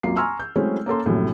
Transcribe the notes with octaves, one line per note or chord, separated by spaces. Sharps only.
C2 F#2 A#3 F4 C7
G#5 A#5 C6 C#6 E6 F6
G6
F#3 G#3 A3 C4 C#4 E4
A#3 C#4 A4 C6
A#1 F#2 A2 C3